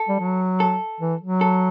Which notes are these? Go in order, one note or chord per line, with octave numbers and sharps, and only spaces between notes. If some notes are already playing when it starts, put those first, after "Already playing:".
Already playing: A4
G3
F#3
A4
E3
F#3
A4